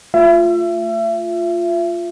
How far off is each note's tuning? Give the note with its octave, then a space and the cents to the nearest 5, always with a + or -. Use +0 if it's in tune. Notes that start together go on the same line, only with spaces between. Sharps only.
A3 +25 F4 +0 E5 +35